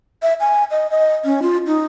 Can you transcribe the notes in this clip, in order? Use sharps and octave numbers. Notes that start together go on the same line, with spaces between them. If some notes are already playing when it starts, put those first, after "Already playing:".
E5
G#5
D#5
D#5
C#4
F4
D#4